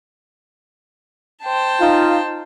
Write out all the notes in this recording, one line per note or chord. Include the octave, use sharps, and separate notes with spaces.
C5 G5 A5
D#4 F4